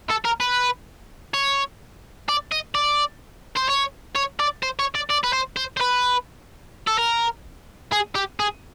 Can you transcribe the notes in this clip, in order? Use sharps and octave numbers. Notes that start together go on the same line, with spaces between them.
A4
A#4
B4
C#5
D5
D#5
D5
C5
C#5
C#5
D5
C5
C#5
D5
D5
B4
C5
C5
C5
B4
A4
A#4
G#4
G4
G#4